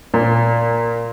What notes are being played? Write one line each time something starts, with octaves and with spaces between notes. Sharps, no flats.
A#2